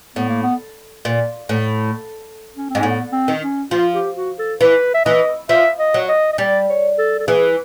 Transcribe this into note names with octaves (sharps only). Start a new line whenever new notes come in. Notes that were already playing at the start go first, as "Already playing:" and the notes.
A2 B3
A#3
B3
A#2
A2
C#4
G#2 C4
A2 B3
C4
D#3
C#4
F3 F4
G4
F#4
A4
E3 B4
E5
E3 D#5
F3 E5
D#5
F#3
D#5
D#5
G3 D5
C#5
A4
A4
E3 G#4